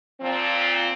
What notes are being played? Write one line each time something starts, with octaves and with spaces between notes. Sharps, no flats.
A#2 F3 C4